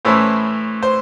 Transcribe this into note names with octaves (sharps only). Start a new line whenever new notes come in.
A2 E3 A3 C#4 E4 C5
C5